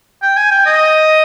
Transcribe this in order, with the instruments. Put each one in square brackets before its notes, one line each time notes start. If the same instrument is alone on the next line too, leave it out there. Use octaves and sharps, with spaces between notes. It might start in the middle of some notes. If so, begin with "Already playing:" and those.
[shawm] G5
G#5
G5
D#5